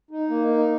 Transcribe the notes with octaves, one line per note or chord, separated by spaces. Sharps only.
D#4
A#3
D#4